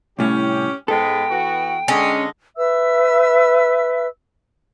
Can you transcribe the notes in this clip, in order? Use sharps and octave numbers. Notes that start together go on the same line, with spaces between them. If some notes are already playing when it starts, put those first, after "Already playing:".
C2 A2 C#4 G4
G#2 G#3 B3 A4 G5
E3 B3 F#4
D3 G#3 C#4 D#5
B4 E5 E6